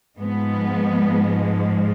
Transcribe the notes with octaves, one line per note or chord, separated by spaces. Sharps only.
G#2 F3 G#3 B3